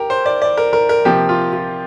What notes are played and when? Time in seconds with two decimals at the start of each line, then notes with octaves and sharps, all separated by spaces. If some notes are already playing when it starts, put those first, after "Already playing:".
Already playing: G4 A#4
0.10 C5
0.26 D5
0.42 D5
0.57 A#4
0.73 A#4
0.89 A#4
1.05 C3 F3 A#3 G4
1.29 F4
1.53 F4